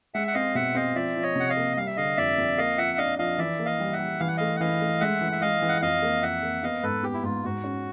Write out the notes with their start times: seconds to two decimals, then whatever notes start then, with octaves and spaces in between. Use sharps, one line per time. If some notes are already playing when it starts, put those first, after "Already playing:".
0.14 G#3 E5 F#5
0.27 F#5
0.34 C4 D#5 F5
0.55 B2 E5 F#5
0.75 C4 D#5 F5
0.95 F3 D5 E5
1.16 F3
1.23 C#5 D#5
1.36 C3 F#5
1.49 D#5 F5
1.57 A#3
1.77 G3 F5
1.87 E5
1.97 D3 D#5 F5
2.17 F2 D5 E5
2.38 F2
2.58 A#3 D#5 F5
2.78 F3 E5 F#5
2.98 D4 D#5 F5
3.19 F3 D#5 F5
3.38 E3 D5 E5
3.59 A#3
3.65 D#5 F5
3.80 G3
3.93 E5 F#5
3.99 G3
4.20 E3 F5
4.28 F#5
4.37 A3 D#5 F5
4.56 F#5
4.60 E3 D#5 F5
4.81 A3
5.00 G#3 E5 F#5
5.21 E3
5.32 E5
5.41 G#3 D#5 F5
5.62 E3
5.69 F#5
5.82 F2 D#5 F5
6.02 A#3
6.22 F2 E5 F#5
6.43 A#3
6.63 B3 D#5 F5
6.83 G#2 A4 B4
7.03 B3 G4
7.14 E4
7.23 G#2 F4
7.44 G#2 F#4
7.64 C#4